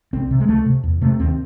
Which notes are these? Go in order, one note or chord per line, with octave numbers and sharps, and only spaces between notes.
C2 C4
C3
G#3
C#2 A3
C3
E2
C3 A3
D#2 C4